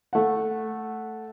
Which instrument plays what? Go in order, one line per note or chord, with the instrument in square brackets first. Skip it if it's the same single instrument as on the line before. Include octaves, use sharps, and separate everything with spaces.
[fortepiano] A3 F#5